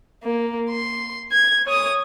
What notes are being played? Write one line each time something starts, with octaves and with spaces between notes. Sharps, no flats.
A#3
C6
G#6
C#5 D#6